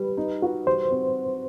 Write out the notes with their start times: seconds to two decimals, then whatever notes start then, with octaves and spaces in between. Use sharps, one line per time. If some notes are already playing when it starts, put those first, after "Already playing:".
Already playing: G3 B4
0.17 D#4
0.42 F#4
0.66 G3 C5
0.91 C4